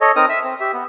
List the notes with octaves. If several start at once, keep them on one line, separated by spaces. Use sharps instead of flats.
A4 C#5 D#5
C4 D#4 A#4 A#5 D#6
E5 E6
C4
G4 E5
B3